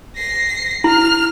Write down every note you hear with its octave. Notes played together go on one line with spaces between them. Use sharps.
A#6 C7
E4 F6